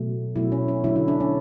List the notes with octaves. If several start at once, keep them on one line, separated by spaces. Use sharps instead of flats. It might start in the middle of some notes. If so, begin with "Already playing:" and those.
Already playing: B2 F#3 A3
B2 F#3 A3 E4
C#4
C#4
D3 F#3 A3 E4
E4
D4
C#4